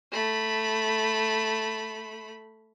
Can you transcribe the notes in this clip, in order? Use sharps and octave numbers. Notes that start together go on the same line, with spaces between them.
A3 B5